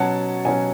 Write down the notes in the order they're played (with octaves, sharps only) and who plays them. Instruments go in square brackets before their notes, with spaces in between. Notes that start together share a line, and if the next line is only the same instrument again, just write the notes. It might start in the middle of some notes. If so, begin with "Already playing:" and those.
Already playing: [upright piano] B2 F#3 C#4 F#5 A5
B2 F#3 C#4 G#5